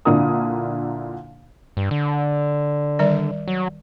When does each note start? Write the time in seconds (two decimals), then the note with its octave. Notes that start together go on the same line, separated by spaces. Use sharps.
0.05 A#2 D3 D4 E4 A#4 D#6
1.77 G2
1.91 D3
2.99 D#3 G3 D5
3.48 F#3